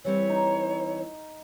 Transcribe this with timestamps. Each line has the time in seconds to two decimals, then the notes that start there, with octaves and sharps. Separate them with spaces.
0.05 E3 G3 C4 C#5
0.29 D#4